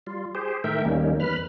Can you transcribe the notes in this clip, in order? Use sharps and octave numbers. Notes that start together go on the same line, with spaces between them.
G3 F4
G4 G#4 C5
A2 D#3 A3 A#4 E5 G5
D#2 D#3 G3 A#3 C#4 D#4
E2 B4 B5 F6